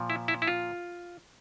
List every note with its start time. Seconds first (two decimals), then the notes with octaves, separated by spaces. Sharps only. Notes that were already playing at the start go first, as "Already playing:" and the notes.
Already playing: A#2 F3
0.10 E4
0.28 E4
0.42 E4
0.47 F4